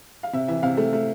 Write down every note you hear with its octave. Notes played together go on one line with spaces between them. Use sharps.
F5
C3 E5
E3 E5
C3 F5
A3
A3